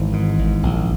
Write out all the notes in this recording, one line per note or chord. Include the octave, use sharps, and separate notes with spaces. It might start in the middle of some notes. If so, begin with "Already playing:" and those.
Already playing: G#1 E3
G#2
G#1
A#1